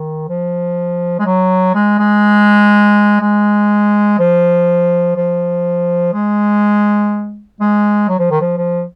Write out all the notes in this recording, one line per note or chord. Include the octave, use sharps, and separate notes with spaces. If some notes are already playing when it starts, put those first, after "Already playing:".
Already playing: D#3
F3
G#3
F#3
G#3
G#3
G#3
F3
F3
G#3
G#3
F#3
F3
D#3
F3
F3